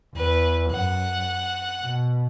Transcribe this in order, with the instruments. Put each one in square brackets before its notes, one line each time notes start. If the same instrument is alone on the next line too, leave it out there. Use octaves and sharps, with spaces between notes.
[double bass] E2 [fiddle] B4
[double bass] F#2 [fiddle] F#5
[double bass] B2